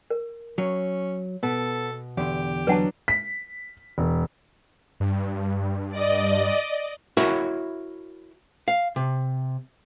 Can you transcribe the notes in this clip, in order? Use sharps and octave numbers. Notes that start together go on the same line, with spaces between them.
A#4
F#3 C#4
B2 B3 A4
E2 D3 G4
F#3 D4 B4 F#5 A5
B6
E1
G2
D5 D#5
E4 F#4 A#4 C#5 E5 B5
F5
C3